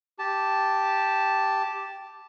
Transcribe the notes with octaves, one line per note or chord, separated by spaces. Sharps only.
G4 A5